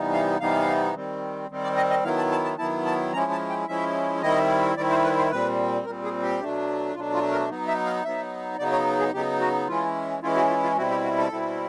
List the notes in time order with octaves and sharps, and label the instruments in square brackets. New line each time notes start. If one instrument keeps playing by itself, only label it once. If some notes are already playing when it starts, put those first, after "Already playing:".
Already playing: [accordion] C3 E3 G3 B3 D#4
F5
C3 E3 G3 B3 D#4 F5
D#3 G3 C4
D#3 G3 C4
D5
D#5
D#5
D#3 F#3 B3 E4 F5
A5
A5
A5
D#3 F#3 B3 E4 A5
A5
F3 G#3 C#4 E4 A#5
A5
G5
F3 G#3 C#4 E4 E5
D#3 G3 C4 E4 D#5
D#3 G3 C4 E4 D5
C5
B4
C5
A#2 G3 C4 B4
A#2 G3 C4 A#4
G#4
G4
B2 F#3 A3 D4
B2 F#3 A3 D4 F4
F4
A#4
F#3 B3 D#4
E5
F5
F#3 B3 D#4 E5
C#3 F#3 B3 D#4 D5
C#5
G#4
C#3 F#3 B3 D#4 G4
F#4
E3 G#3 C#4 E4 F4
E3 G#3 C#4 E4 F4
F#4
F4
F4
B2 G3 C4 E4 F#4
G4
F#4
A4
B2 G3 C4 E4